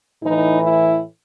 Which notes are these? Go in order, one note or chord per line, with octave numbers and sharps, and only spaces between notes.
A2 E3 D#4
E4